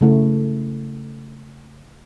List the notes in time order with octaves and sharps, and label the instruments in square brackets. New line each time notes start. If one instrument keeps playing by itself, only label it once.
[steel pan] C#3 A3 E4